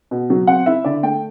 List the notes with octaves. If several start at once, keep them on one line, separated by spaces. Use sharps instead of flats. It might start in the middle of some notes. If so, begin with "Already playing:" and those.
B2
F#3
C4 F#5
E4 E5
D3 D5
A3 G5